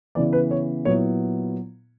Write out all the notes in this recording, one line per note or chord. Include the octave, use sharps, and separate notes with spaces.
C#3 E3 B3 D5
B4
C#5
A#2 F#3 B3 E4 C#5